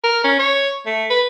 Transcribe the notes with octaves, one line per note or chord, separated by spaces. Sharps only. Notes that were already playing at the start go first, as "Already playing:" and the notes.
A#4
C#4
C#5
A3
B4